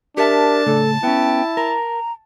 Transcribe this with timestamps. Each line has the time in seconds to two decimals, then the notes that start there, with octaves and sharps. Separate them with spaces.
0.17 D4 G4 A#4 E5 A5
0.66 A2 C#3 A3 A4
1.03 B3 C#4 E4 G5
1.57 A#4 A#5